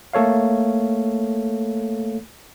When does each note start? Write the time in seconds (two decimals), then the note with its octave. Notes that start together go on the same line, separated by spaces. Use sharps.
0.13 A3 A#3 A4 C#5 F5